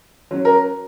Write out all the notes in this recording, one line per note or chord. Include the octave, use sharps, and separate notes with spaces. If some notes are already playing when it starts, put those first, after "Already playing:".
F#3 C#4
A#4